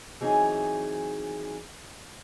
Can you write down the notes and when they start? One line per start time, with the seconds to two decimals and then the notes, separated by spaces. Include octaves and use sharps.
0.21 E3 F#3 C4 D#4 G#4